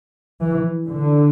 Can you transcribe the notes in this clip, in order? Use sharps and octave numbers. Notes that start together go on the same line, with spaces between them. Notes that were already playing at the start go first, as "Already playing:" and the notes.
E3
D3